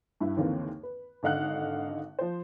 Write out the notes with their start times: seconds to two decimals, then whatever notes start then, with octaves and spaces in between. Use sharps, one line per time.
0.21 G2 E4
0.37 D#2 D3 E3 A#3 C4
0.83 B4
1.23 G#1 D3 D#4 F5 F#5 F#6
2.19 F3 C5